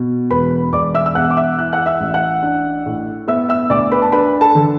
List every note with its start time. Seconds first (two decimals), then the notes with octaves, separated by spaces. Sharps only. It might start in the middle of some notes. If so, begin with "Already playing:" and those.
Already playing: B2
0.31 E1 B4 B5
0.73 E1 D5 D6
0.94 E5 E6
1.06 E6
1.15 E2 F#5 F#6
1.31 D6
1.37 E5 E6
1.58 E3 F#6
1.73 F#5 F#6
1.86 E5 E6
2.01 A1
2.14 F#5 F#6
2.43 D4
2.86 A2
3.28 B3 E5 E6
3.49 E5 E6
3.70 D2 D5 D6
3.92 B4 B5
4.02 A5
4.12 D4 B4 B5
4.41 A4 A5
4.55 D3